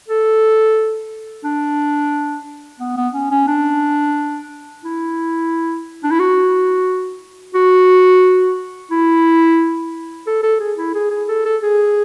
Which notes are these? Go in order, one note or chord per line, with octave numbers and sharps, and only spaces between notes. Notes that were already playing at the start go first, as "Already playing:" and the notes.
A4
D4
B3
B3
C#4
C#4
D4
E4
D4
E4
F#4
F#4
E4
A4
A4
G#4
E4
G#4
G#4
A4
A4
G#4